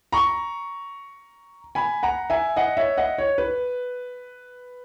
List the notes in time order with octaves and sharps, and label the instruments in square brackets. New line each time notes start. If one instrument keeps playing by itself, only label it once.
[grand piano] A#5 C#6
G#5 B5
F#5 A#5
E5 G#5
D#5 F#5
C#5 E5
D#5 F#5
C#5
B4